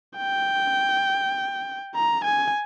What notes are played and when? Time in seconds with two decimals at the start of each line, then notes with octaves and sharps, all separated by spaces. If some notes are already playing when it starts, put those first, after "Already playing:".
0.17 G5
1.95 A#5
2.24 G#5